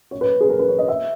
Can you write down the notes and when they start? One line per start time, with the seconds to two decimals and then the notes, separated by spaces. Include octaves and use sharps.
0.11 C#5
0.21 B4
0.40 G#4
0.50 A#4
0.59 B4
0.68 C#5
0.79 D#5
0.88 E5